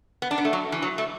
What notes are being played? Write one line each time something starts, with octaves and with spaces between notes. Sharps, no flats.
B3
D4
B3
A3
F#3
E3
F#3
A3